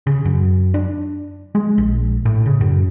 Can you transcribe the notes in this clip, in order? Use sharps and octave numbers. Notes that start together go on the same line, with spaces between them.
C#3
F#2
D4
G#3
A#1
A2
C#3
F#2